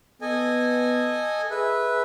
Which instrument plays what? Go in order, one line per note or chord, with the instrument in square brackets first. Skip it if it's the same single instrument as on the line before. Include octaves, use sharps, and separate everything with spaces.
[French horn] B3 [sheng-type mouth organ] A4 D#5 G#5
[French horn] G#4 [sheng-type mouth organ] B4 E5